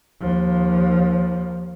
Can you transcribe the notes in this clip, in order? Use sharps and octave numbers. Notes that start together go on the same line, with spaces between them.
D#2 F3